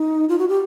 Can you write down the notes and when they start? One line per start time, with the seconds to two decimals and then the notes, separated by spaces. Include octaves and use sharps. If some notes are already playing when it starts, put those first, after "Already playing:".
Already playing: D#4
0.29 F4
0.39 F#4
0.49 G4